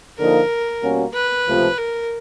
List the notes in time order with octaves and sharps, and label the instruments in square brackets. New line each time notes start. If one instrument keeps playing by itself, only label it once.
[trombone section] D3 F3 A#3 D#4 [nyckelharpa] A#4
[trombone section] B2 G3 A#3 C#4 F#4
[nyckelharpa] B4
[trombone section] C#2 C3 F3 A3
[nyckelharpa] A#4